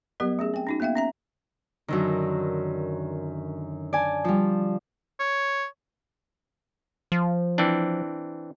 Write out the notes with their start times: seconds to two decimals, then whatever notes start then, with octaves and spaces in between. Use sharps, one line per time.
0.20 F#3 G3 B3 G4 A#4 D#5
0.39 A3 C#4 G#4
0.54 C4 G5
0.67 C#4 D#4 F#4
0.80 A#3 B3 E5 F5 G5
0.95 C#4 E5 A#5
1.88 F#2 D3 D#3
3.93 D5 G#5 A5
4.24 F3 G3
5.20 C#5
7.12 F3
7.58 E3 C4 D4